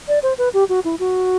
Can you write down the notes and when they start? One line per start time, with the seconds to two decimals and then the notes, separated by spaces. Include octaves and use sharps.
0.08 D5
0.23 C5
0.38 B4
0.53 G4
0.69 F#4
0.85 E4
0.99 F#4